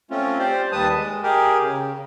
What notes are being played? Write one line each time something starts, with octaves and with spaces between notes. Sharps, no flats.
A3 C4 C#4 F4
G4 C5 D5
D#2 G3 B4 A5 D#6
G#3
G4 G#4 A#4
C#3